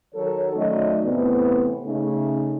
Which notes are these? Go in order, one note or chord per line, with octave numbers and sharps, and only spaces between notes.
D#3 F#3 A4 A#4 C#5
D#3 F#3 A3 C#4 D5 D#5
A2 C3 E3 B3
C#3 A3 D#4